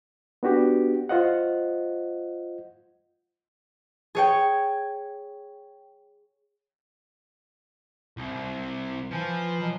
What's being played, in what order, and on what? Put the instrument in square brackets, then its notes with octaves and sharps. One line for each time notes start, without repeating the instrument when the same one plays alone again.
[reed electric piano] B3 D4 F#4 G4
F4 C5 D#5 F#5
[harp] G#4 C#5 G5
[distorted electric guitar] C2
[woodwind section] E3 [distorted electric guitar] F3
[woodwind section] B2 F#3